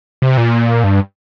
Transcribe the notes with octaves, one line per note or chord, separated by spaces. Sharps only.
C3
A#2
G2